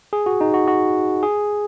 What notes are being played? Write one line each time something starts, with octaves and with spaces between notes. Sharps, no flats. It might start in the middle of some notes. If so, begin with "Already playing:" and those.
G#4
F#4
D#4
F#4
F#4
G#4